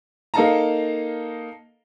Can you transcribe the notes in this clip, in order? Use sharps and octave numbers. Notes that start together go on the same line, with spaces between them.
A#3 D#4 A4 F5 A5 A#5